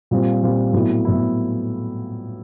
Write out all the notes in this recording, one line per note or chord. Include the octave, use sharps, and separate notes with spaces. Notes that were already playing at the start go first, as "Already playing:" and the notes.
A#2 G3 C4 F4
A#2 G3 C4 F4
A2 F#3 B3 E4
A2 F#3 B3 E4